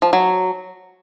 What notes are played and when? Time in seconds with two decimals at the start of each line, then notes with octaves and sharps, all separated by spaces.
0.02 F3
0.13 F#3